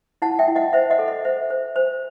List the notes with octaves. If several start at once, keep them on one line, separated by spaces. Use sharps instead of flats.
E4 F#5 A5
E5 G5
E4
D#5 F#5
C5 E5
D#5 F#5
A4
D#5
C5 E5
C5
C5